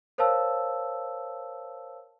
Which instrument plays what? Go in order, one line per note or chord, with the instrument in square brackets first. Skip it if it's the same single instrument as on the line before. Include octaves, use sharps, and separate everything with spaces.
[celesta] A#4 C5 C#5 F5 A5 E6